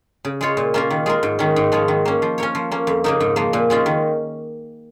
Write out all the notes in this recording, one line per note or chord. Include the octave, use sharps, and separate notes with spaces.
C#3
G#3 F4 C#5
A#2
A#3 C#4 F4 A#4
D#3
G#3 F4 A#4
G#2
D#3 C#4
G#2
F3 G#3 F4 C#5
D#3
A#3 C#4
F3
C#4 A#4 C#5
F3
A#3 C#4
F2
C#3 A#3 D#4 A#4
G#2
F3 A#3
A#2
G#3 C#4 F4
D#3